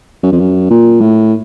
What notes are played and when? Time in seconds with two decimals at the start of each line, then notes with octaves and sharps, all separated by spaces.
0.23 F#2
0.32 F2
0.40 F#2
0.71 A#2
1.01 A2